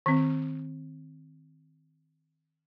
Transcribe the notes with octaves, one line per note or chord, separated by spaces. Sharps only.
D#3 C4